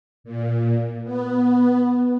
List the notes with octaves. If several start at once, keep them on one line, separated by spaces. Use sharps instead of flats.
A#2
B3